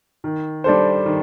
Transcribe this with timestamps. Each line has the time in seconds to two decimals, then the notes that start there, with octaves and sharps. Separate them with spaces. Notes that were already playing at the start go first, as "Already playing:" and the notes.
0.24 D#3
0.64 G3 D4 A4 C5
1.06 D#3